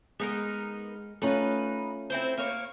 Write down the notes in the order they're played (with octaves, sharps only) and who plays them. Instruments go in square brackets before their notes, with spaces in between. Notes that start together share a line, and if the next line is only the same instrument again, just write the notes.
[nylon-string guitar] G#3 [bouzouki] B3 D#4 A#4
[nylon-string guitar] A3 C#4 F4 [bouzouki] D#4 B4
[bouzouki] C4 E4 C5
A#3 C#5